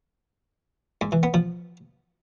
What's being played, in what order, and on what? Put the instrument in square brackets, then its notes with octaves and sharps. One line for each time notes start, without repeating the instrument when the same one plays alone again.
[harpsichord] G#2
E3
B3
F3